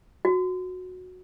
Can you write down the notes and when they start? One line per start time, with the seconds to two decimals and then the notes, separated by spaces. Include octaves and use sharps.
0.25 F#4